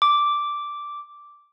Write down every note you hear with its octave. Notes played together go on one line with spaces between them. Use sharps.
D6